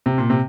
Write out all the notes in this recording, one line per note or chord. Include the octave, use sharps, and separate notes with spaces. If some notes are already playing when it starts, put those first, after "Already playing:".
C3
A#2
C3